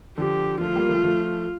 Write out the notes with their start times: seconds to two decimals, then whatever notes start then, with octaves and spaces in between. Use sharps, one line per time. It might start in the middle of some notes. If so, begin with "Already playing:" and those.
0.17 D3 F3 G4
0.61 F3 A3 F4
0.76 G3 A#3
0.89 F3 A3
1.04 F3 A3